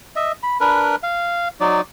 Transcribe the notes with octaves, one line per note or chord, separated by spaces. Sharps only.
D#5 E5
B5
D4 A#4 B4 B5
F5
F#3 D#4 D5